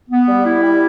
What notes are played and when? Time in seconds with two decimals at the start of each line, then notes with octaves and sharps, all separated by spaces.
0.09 B3
0.27 G3
0.45 E4
0.62 G3